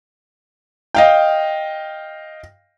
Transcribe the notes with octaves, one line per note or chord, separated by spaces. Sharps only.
D#5 F5 G5